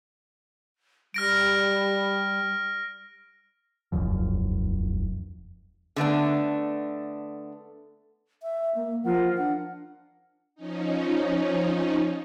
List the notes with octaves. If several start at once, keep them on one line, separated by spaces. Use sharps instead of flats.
G3 F6 A#6 D7
E1 C#2 F#2 F3
D3 A3 B3 D4
E5
A#3
F3 F4 A#4 F#5
D4 F#5
F3 C#4 D#4